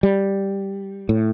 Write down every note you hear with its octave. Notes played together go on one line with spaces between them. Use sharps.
G3
A2